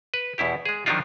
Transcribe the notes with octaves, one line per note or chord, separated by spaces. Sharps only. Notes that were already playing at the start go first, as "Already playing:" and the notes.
B4
E2 B2 E4 G4
G#3 G#4
D#3 F3 F#3 D4 D#4 F4